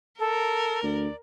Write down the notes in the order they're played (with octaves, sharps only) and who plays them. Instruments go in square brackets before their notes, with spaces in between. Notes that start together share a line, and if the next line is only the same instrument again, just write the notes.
[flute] A4 [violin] A#4
[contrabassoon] D2 [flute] D5